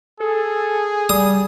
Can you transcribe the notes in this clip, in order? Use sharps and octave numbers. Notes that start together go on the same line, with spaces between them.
G#4 A4
G3 D#6